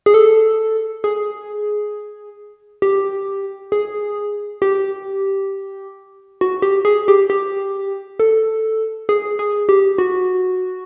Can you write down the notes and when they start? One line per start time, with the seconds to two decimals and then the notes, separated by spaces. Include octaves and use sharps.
0.06 G#4
0.14 A4
1.04 G#4
2.82 G4
3.72 G#4
4.62 G4
6.41 F#4
6.62 G4
6.85 G#4
7.08 G4
7.30 G4
8.20 A4
9.09 G#4
9.39 G#4
9.69 G4
9.98 F#4